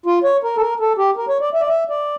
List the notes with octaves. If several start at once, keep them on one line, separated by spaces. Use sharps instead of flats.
F4
C#5
A#4
A4
A#4
A4
G4
A#4
C#5
D5
E5
D5
E5
D5